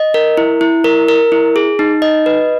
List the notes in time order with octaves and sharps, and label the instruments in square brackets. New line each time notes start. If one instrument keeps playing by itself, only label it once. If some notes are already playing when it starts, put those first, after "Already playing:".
Already playing: [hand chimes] D#5
A#4
E4
E4
A#4
A#4
E4
G#4
D#4
D#5
B4